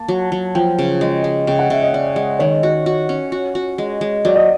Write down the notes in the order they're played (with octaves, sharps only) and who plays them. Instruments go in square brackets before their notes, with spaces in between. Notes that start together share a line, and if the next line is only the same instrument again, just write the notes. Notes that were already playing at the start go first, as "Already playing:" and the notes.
Already playing: [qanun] A#3 [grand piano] A5
[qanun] F#3
F#3
[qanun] F3 [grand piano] G5
[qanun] C#3
G#3
G#3
[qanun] C#3 [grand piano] G5
[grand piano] F#5
[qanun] C#3 [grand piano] E5
[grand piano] D#5
[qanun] C#4 [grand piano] D5
[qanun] G#3
[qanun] D#3 [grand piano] C#5
[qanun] F#4
F#4
C#4
F#4
F#4
G#3
G#3
[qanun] F#3 [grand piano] D5
[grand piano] D#5